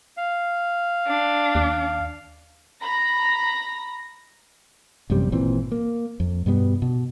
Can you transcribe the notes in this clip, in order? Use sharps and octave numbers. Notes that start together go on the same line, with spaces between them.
F5
D4
D#2
A#5 B5 A#6
A1 F#2 C3 G3
G#1 A#2 E3 C4
A#3
F2
G2 B2 G3 B3
B2